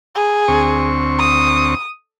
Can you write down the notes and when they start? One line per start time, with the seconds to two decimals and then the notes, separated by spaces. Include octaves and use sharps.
0.15 G#4
0.48 D2 C4 C#6
1.19 D#6